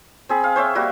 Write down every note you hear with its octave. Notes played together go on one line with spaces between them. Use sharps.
C4 G#4 B5
F5
C5 C#5 E5 G5
G3 A#3 F#4